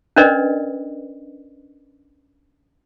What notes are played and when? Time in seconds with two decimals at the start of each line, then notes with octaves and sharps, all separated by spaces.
0.16 C#4 D4 A#4 B4 D5 D#5